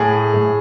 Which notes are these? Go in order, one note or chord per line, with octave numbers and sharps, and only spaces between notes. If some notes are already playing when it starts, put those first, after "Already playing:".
Already playing: A2 G#4
A2